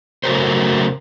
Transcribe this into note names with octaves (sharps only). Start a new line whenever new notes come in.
C#3 F#3 A3 A#4 C5